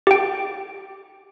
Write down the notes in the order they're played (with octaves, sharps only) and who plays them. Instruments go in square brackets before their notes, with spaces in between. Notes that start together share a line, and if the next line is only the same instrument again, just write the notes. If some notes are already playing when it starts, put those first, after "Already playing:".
[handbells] G4 G5